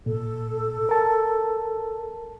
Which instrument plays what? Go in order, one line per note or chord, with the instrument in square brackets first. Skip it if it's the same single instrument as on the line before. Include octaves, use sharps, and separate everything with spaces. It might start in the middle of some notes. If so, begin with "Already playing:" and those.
[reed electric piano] A#2 [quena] A4
[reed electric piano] A#4 A5